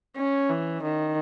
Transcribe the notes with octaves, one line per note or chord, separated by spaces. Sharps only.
C#4
E3
D#3